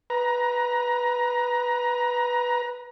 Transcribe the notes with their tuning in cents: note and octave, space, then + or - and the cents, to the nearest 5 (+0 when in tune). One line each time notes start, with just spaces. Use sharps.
B4 +0 A#5 +20